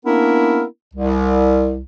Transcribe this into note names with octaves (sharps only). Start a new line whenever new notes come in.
A#3 B3 C#4 D4 E4 A#4
C2